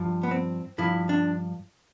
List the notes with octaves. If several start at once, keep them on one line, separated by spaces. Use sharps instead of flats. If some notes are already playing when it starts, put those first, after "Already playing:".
Already playing: G2 F3
B3
C4
G2 F3 E4
D4